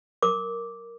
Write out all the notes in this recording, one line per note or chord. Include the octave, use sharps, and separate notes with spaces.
A#4 D6